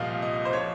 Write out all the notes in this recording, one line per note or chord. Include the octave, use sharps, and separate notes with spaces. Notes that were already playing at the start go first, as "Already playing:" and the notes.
Already playing: C2 A#2 F3 D#5 F5
D#5
C5
F3 C#5